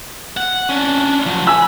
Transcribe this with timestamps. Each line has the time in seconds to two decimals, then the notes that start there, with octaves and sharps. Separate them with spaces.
0.37 F#5
0.69 C#4 D4
1.26 F3 F#3
1.47 G#5 B5 E6